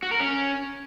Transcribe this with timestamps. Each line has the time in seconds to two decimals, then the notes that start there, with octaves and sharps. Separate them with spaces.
0.03 F#4
0.11 A#4
0.20 C#4